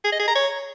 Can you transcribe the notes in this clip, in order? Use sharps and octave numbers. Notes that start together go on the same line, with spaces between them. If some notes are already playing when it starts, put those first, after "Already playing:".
G#4
D#5
G#4
A#5
C#5